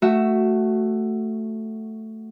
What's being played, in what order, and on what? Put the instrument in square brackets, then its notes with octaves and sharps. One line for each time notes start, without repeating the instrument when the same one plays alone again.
[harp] A3 F#4 E5